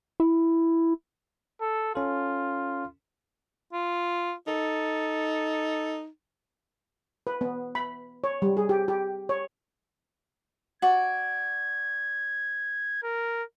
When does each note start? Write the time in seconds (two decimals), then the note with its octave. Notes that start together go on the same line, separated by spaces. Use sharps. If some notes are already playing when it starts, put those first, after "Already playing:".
0.20 E4
1.61 A4
1.95 C#4 F4 A4
3.73 F4
4.47 D#4 A4
7.27 B4
7.41 B3
7.75 B5
8.24 C#5
8.42 G3
8.57 G#4
8.69 G4
8.88 G4
9.29 C#5
10.82 F#4 D5 G#6
13.03 A#4